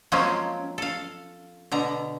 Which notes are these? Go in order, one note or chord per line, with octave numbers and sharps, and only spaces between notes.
F3 F#3 G#3 A#3 C4 C#4
A4 F5
B2 D3 A#5